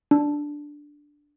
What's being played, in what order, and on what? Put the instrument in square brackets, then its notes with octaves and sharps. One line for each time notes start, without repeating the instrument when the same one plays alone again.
[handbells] D4